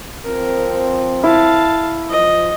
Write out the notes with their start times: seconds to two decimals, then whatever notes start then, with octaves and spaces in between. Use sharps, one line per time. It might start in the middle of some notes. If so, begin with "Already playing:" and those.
0.25 F3 C4 A#4
1.24 E4 F5 A5
2.10 F3 D#5